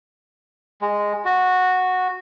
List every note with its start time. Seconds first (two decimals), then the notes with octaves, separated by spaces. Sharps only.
0.81 G#3
1.25 F#4